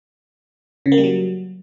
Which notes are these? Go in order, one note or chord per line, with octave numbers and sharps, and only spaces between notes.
C#3
A#3
G3
F#3